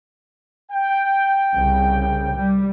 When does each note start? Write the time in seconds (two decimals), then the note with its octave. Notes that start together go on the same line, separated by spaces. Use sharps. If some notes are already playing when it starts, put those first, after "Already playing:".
0.71 G5
1.53 C2 C#3
2.36 G3